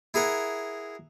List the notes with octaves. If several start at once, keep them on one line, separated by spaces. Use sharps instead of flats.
E4 G#4 A#4 F#5